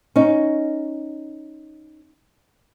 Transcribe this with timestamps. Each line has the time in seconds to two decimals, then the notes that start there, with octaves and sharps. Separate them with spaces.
0.16 C#4 D#4